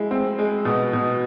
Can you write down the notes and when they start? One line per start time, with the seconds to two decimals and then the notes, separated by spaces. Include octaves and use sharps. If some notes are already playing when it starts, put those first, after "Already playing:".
Already playing: G#3 E4
0.11 C4
0.39 G#3
0.65 B2
0.93 B2